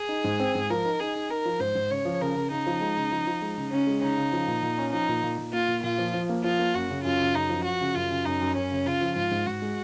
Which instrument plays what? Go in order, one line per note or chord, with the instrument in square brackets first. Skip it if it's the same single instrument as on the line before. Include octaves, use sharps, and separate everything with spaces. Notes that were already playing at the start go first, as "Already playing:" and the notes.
Already playing: [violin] G#4
[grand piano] D#4
G#2
C4
G#2
[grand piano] F3 [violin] A#4
[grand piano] D#4
[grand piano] D#4 [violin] G#4
[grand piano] D#4
[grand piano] D#4 [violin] A#4
[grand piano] F3
[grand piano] G#2 [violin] C5
[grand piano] G#2
[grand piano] C#3 [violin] C#5
[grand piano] F3
[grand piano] C#3 [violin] A#4
[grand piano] C#3
[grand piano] C#3 [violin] D#4
[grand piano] F3
G#3
C#3
F3
F3
G#3
C#3
[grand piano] C#3 [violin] C#4
[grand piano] G#3
[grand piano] C#3 [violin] D#4
[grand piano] C#3
F3
A#2
A#2
C#4
[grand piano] F3 [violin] D#4
[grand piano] A#2
A#2
A#2
[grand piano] A#3 [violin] F4
[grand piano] A#2
[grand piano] A#2 [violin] F4
[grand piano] F3
F3
A#3
[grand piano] F3 [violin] F4
[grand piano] A#3
[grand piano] F#2 [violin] F#4
[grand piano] C#3
[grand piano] F#2 [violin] F4
[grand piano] C#3
[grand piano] F#2 [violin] D#4
[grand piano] F3
[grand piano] F3 [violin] F#4
[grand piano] C#3
[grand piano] F#2 [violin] F4
[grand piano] C#3
[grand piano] F#2 [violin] D#4
[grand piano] F#2
[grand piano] F#2 [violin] C#4
[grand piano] C#3
[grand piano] C#3 [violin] F4
[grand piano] F3
[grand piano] G#2 [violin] F4
[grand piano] G#2
[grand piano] G#2 [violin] F#4
[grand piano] G#3